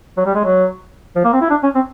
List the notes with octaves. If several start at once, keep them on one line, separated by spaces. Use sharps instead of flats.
F#3
G3
G#3
F#3
F3
A#3
C4
E4
D4
C#4
C4